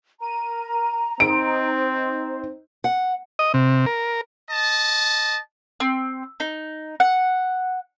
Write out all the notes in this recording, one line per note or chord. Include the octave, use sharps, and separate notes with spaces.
A#4 A#5 D#7
C4 D#4 C5 D7
F#5
D#5
C3
A#4
D#5 A5
C4
D#4
F#5